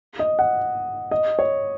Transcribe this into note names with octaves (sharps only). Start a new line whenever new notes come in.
D#5
F#5
D#5
C#5